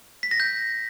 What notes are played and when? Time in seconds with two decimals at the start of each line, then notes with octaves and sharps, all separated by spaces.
0.23 B6
0.31 A#6
0.40 G6